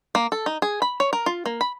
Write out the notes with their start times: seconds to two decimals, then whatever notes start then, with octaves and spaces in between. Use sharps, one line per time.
0.15 A#3
0.32 A4
0.46 D#4
0.62 G#4
0.82 B5
1.00 C#5
1.13 A#4
1.26 F4
1.46 A#3
1.61 B5